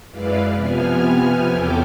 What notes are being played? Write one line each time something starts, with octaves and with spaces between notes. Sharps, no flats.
F#2 G#3 E4 B4 D5 F5
C3 F3 B3 G#5 F6
E2 C#3 E4 A4 G5 D6